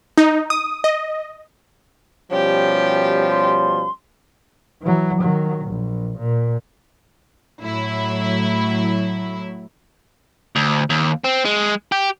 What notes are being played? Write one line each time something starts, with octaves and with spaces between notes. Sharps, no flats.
D#4
D#6
D#5
B2 F3 G3 C#4 G4
C6
E3 F#3
D#3 F#3
A#1
A#2
A2 F#3 E4
D2
D#2
C4
G#3
G4